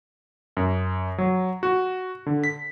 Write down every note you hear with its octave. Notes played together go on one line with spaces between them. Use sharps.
F#2
F#3
F#4
D3
B6